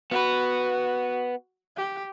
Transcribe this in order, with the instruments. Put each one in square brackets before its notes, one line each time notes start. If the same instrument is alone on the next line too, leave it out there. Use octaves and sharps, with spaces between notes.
[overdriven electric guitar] B3 B4 [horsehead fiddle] F#4
[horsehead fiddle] G4